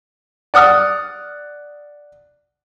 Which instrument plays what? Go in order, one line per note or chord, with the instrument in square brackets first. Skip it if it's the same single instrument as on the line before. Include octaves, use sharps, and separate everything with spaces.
[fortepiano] D5 F#5 D#6 F6